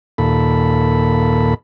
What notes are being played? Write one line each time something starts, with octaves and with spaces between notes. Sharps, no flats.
D#2 A#2 A4 B5